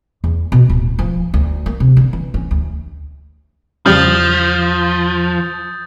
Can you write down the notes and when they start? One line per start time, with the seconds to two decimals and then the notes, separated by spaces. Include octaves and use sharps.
0.24 E2
0.52 B2
0.70 D1
0.99 F3
1.34 D2
1.66 A#3
1.80 C3
1.97 D3
2.13 E3
2.34 C#4
2.51 D2
3.86 E2 C#3 F3 G3 D#6 F6 G6 A6